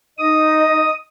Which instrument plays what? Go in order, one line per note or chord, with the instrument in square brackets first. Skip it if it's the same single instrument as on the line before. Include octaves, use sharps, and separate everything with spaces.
[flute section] D#4 D#5 [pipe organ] D#6